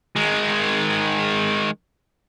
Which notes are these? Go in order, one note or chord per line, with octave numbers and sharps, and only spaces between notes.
D#3 G#3